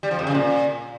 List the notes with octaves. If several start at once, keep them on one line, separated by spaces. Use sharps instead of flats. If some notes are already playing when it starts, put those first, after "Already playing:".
G3
F3
F2
C#3
A#2